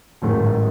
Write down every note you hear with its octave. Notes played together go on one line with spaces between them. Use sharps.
A1 G#2 D#3 F#3 A3